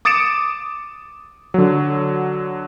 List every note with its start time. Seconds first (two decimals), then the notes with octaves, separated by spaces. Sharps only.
0.05 D6 D#6 A6 C#7 D7 E7
1.54 D3 F#3